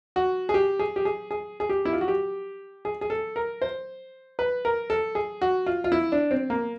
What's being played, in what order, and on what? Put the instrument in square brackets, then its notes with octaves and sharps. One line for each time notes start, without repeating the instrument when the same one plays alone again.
[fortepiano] F#4
G#4
G4
G#4
G4
G#4
G#4
G#4
G4
E4
F4
F#4
G4
G#4
G#4
A4
A#4
C5
B4
A#4
A4
G#4
F#4
F4
F4
E4
D4
C4
A#3